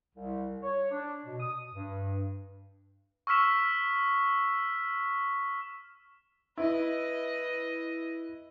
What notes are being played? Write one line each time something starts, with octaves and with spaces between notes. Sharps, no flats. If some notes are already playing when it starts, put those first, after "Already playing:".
C2
C#5
D4
B2
D#6
G2
C#6 E6 F6 B6 E7
E4 B4 D#5